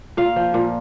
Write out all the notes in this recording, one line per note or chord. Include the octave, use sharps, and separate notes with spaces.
A#2 F5
F3
A#2